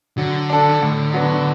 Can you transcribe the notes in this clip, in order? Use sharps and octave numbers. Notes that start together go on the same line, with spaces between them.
D3 F#3
D4 A4
A2
F#3 B3 D4 F#4